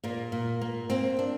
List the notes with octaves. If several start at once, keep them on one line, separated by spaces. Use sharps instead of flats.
A#2 A#3
A#2
A#3
A#3 C4
D4